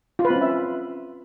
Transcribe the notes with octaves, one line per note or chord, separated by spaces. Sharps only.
F4
B4
C4
C#4
E5